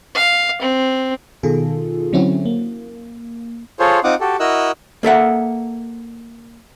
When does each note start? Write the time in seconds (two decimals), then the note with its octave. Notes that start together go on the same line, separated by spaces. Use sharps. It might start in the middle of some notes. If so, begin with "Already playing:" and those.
0.15 F5
0.61 C4
1.43 B2 D#3 F4 G#4 A4
2.13 D3 F#3 C4 C#4 E4 F#4
2.46 A#3
3.80 F4 G#4 A4 C5 C#5
4.04 C4 D#4 F4 F#5 D6 D#6
4.21 F#4 G4 A4
4.40 E4 F#4 A#4 D#5 E6 F#6
5.03 A#3 A4 E5 F#5